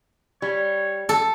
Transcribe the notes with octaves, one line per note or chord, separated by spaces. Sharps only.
G3 C#5
A4